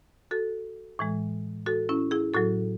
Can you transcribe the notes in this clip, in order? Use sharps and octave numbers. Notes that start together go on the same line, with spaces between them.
F#4 A4
A2 E3 G#3
F#4 A4
C#4 E4
E4 G#4
A2 F#3 F#4 A4